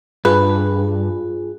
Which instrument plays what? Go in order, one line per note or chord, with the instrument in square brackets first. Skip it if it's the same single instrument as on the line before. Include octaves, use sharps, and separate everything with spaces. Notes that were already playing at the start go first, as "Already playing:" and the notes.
[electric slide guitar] G2 [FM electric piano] F4 G#4 [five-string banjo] B4